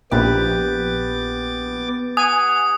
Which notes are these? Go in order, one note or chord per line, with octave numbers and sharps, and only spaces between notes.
A#1 B3 G4 B4 D6 A6
F#5 G#5 D#6